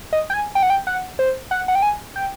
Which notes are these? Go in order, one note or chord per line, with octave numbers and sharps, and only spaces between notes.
D#5
G5
G#5
G5
F#5
G5
F#5
C5
F#5
F#5
G5
G#5
G5